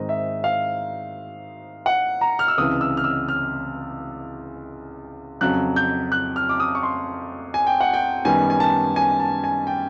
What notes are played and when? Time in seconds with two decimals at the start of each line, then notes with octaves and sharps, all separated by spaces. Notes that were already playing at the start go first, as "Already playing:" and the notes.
Already playing: G#2 D#3 G#3 C4 D#4 D#5
0.09 E5
0.44 F5
1.86 F#5
2.21 A#5
2.39 F6
2.48 E6
2.58 C#2 C3 E3 D#6
2.81 E6
2.97 F6
3.04 E6
3.28 F6
5.41 F2 C#3 F#3 F#6
5.76 G6
6.12 F#6
6.36 F6
6.49 D6
6.60 D#6
6.75 C#6
6.83 C6
7.54 G#5
7.67 G5
7.81 F#5
7.94 G5
8.25 F#2 D#3 G3 B3 G#5
8.50 G#5
8.60 A5
8.96 G#5
9.20 A5
9.44 G#5
9.67 G5